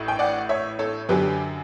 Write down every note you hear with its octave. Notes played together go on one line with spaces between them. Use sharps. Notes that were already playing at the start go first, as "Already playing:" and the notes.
Already playing: A1 A2
G5
D5 F#5
C#5 E5
A4 C#5
F#2 D3 F#3 G4 B4